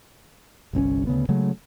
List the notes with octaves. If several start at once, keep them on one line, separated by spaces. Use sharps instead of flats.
G1 C2 C4 C#4
D2 C#3 B3
C#3 F#3 G#3 A3